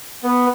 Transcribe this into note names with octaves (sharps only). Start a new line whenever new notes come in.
B3